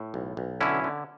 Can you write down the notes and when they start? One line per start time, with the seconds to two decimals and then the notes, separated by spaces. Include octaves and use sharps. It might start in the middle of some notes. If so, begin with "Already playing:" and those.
Already playing: A2
0.14 B1
0.37 B1
0.61 D3 C#4 E4
0.84 D3